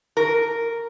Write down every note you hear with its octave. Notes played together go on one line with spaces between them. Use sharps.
A#4